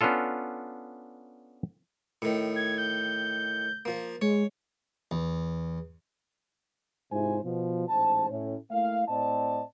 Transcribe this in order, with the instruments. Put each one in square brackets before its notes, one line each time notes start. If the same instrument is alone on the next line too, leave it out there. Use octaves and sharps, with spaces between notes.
[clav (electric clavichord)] B3 C#4 D4 F4 A4
[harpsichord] A2 D#3
[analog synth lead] G#6
G6
[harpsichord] F3 A#3
[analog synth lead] G#3 [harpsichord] C#5
[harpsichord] E2
[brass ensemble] G#2 C3 E4 F4 C5 G#5
B2 F3
A1 G#2 C5 A5
A2 C#4
A3 A#3 E4 F5
A2 C4 D5 D#5 A5